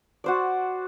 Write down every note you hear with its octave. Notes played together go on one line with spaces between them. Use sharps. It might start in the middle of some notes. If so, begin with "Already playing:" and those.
F#4 C5 D5